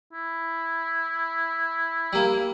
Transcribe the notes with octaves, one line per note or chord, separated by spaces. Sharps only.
E4
G3 A#3